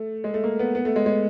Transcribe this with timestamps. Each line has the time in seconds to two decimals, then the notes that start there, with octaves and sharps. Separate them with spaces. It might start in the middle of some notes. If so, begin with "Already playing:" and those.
Already playing: A3
0.24 G#3
0.34 A3
0.44 A#3
0.59 B3
0.75 B3
0.85 A3
0.96 G#3
1.06 G#3